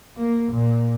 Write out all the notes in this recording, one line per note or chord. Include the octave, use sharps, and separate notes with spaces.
A#3
A#2